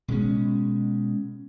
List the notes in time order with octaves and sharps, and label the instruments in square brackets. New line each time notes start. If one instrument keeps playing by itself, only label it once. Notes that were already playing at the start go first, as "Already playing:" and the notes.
[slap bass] B2 G#3 C#4